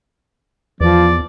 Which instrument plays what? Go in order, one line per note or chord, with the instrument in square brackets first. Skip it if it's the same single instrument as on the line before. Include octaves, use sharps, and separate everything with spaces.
[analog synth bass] E2 [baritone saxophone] F3 [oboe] D5